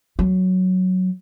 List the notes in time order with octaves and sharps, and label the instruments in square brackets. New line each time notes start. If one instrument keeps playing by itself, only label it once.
[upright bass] F#3